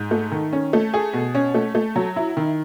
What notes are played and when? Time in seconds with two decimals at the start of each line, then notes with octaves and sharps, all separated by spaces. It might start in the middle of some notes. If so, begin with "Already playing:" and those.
Already playing: G#2
0.11 A3
0.32 D#3
0.53 C#4
0.73 A3
0.94 G#4
1.13 B2
1.35 C#4
1.54 A3
1.75 A3
1.96 F#3
2.16 E4
2.37 D#3